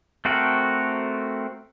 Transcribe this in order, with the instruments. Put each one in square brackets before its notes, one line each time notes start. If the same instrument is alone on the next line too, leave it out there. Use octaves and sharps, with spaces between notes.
[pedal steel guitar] A3 C4 F#4 A4 A#4